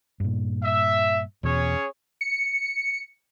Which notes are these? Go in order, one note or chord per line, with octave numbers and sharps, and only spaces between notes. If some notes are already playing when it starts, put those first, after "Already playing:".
G2 A#2
E5
E2 B2 C#4 G#4 C#5
C#7